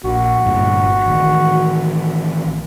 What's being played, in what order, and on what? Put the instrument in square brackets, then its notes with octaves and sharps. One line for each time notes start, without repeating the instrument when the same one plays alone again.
[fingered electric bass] A#1 [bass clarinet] F#4
[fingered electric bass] G1 G2 A#2
A1 D#3